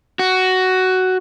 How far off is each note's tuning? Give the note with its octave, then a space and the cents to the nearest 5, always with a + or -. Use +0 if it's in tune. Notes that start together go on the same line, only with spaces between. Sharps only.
F#4 +10